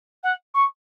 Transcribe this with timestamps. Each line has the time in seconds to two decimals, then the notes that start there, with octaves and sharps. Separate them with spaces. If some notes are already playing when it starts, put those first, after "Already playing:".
0.23 F#5
0.54 C#6